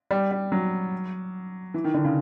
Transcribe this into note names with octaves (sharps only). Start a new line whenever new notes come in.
G3
G3
F#3
E3
D#3
D3
C#3